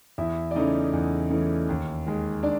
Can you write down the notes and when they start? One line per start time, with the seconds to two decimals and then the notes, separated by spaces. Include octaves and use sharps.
0.18 E2 E4 E5
0.51 D5
0.55 C#3 E3 A3 C#4 D#4 D#5
0.93 E2
1.30 C#3 E3 A3 C#4
1.69 D#2
2.06 D#3 G#3
2.43 D4 D5